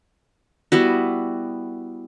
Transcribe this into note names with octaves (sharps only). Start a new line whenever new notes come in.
G3 B3 E4 F#4